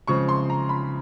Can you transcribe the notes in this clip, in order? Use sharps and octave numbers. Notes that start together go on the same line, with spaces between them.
C#3 F3 G#3 C4 C#6
C6
A#5
B5